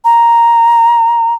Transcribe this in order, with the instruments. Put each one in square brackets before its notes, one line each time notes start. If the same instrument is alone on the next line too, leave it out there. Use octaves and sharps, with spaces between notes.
[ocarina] A#5